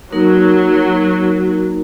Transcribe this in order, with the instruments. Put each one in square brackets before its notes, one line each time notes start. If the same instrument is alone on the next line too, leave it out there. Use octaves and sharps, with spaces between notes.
[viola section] F#3 [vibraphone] A#3 D#4 A#4